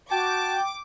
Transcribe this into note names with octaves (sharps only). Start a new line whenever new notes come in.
F#4 G5 A5 D6